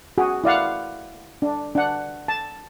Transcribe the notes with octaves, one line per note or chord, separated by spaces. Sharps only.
F#4 G#4
E4 D5 F5 F#5
D4
D4 F#5
A5